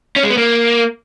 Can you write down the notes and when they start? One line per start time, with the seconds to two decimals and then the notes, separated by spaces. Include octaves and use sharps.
0.16 C#4
0.23 G#3
0.30 B3
0.37 A#3